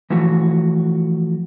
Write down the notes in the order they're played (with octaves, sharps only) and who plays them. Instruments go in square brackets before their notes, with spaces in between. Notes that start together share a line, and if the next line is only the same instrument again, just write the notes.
[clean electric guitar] E3 F3 A3 E4 F#4